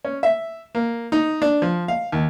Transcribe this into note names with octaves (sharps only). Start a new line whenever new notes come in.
C#4
E5
A#3
D#4
D4
F3
F5
D#2